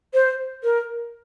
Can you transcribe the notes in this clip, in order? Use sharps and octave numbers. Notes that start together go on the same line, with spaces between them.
C5
A#4